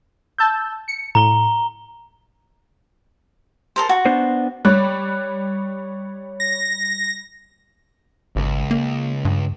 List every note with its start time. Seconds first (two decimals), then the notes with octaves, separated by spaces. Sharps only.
0.38 A5 E6 G6
0.88 C#7
1.15 A2 A#5 G7
3.76 A4 A#4 C5
3.89 F#4
4.06 B3 D4 C5
4.65 G3 C#5 F#6
6.40 A#6
8.36 G#1 C#2
8.71 A#3
9.25 G2